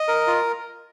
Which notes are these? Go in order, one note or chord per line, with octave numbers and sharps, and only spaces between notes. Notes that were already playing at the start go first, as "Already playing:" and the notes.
Already playing: D#5
A#4
F4